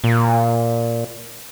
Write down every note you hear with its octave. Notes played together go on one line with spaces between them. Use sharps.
A#2